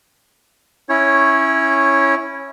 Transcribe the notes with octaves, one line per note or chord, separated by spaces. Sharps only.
C#4 E4 C#5